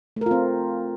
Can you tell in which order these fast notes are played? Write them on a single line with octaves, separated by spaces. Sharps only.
A3 A#4 F4 C4